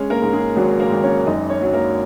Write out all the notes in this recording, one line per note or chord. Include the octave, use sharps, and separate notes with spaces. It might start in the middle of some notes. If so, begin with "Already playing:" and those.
Already playing: G#3 C#4 C#5
A#3 A#4
G#2
G#3 G#4
G#1 F#3 F#4
A#3 A#4
G#1
C#4 C#5
F#2 D#4 D#5
C#4 C#5
F#3
A#3 A#4